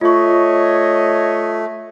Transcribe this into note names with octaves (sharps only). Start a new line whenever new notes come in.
A3 F4 C#5 D#5 C#6